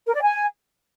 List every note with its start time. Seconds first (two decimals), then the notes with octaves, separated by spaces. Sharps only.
0.07 A#4
0.14 D5
0.22 G#5